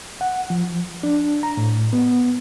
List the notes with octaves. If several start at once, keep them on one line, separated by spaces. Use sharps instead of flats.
F#5
F3
D4
A#5
A2
B3